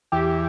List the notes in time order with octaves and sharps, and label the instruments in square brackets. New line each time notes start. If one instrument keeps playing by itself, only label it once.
[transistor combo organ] E2 E3 [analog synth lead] G4